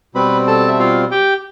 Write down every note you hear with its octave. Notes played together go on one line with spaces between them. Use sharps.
B2 G3 C4 B4 B5
A4 A5
E5
F4 F5
G4 G5